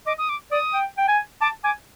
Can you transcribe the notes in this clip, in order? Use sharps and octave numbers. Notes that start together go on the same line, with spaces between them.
D#5 D6
D#6
D6
D5 D#6
G5
G5
G#5
A5 D6
G#5 D6